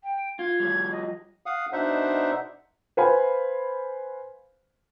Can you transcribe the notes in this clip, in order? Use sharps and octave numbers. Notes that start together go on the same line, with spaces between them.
G5
F4 G#6
F3 G3
D#5
F5 F#5 D#6
B2 D4 D#4 C5 E5 F#5
B4 C5 F5 G#5 B5